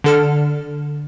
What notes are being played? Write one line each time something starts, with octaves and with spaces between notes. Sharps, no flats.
D3 A4 F6